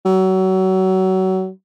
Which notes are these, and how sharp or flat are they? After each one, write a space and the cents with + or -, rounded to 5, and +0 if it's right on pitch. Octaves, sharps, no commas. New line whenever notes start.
F#3 +30